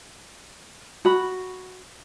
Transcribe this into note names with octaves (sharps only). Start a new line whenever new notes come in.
F#4 B5